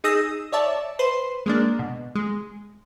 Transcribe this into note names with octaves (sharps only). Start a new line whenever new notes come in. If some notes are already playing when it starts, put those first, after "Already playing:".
D#4 G#4 D#6 E6 A#6
C#5 D5 E5 A5
B4 C5 C6
G#3 A#3 D4
B2
G#3